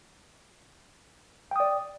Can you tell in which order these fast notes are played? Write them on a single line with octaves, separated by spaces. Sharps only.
G5 D#6 D5